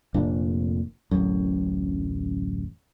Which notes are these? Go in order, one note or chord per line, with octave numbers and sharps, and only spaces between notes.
F1 A#2 D4
D1 A1 F#2